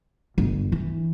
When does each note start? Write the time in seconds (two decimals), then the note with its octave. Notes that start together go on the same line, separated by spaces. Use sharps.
0.38 G1
0.72 E3